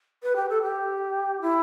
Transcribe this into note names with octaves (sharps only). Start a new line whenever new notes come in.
B4
G4
A4
G4
E4